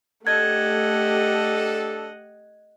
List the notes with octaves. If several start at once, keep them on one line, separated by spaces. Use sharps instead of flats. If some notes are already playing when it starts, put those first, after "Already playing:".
A3 D4 G4 A4 D#5 F#5 G#6